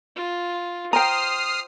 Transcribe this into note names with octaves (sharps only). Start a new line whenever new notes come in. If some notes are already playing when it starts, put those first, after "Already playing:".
F4
C5 G5 A#5 D#6 F6 C7